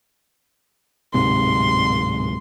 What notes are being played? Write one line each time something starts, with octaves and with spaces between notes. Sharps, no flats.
D1 G#2 C3 C6